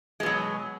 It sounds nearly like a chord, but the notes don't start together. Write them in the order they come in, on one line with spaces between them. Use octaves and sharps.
G#3 B2 F#3